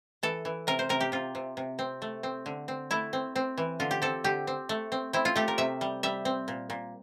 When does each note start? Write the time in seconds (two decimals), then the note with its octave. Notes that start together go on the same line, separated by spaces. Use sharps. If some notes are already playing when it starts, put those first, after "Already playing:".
0.23 E3 A4
0.45 E3
0.67 C3 A#4
0.79 C5
0.89 C3 A#4
1.00 G4
1.12 C3 F4
1.35 C3
1.57 C3
1.79 C4
2.02 A3
2.23 C4
2.46 D3
2.68 C4
2.91 A3 E4
3.13 C4
3.36 C4
3.58 E3
3.80 D3 F4
3.91 G4
4.02 C4 A4
4.24 D3 G4
4.47 C4
4.69 A3
4.92 C4
5.13 C4 E4
5.25 F4
5.36 A3 G4
5.48 A#4
5.58 C3 E5
5.81 G3
6.03 G3 E5
6.25 C4
6.48 A#2
6.70 A#2